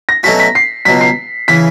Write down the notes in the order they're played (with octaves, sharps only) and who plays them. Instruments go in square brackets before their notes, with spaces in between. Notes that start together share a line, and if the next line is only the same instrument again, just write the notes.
[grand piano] A#6
[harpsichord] B2 F#3 A3 C#4 F#4 [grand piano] B6
[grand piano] B6
C7
[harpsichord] C#2 B2 F#3 [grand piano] B6
[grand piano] C7
[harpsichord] C#3 E3 [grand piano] B6